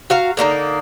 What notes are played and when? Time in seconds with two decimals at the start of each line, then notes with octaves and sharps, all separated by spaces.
0.10 F#4 F5 A#5
0.37 D3 A#3 C4 D#4